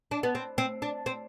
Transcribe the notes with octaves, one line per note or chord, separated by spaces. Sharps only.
D4
B3
C4
C4
D4
C4